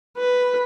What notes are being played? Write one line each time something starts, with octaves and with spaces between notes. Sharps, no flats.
B4